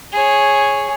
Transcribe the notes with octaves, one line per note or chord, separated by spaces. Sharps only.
G#4 C#5